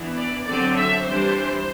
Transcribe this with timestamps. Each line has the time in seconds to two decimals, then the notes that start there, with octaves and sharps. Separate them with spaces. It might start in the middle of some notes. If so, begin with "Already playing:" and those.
Already playing: E3 B3 D4
0.17 D5
0.46 D3 F#3 C4 D5
0.76 E5
1.05 E3 G3 D4 C5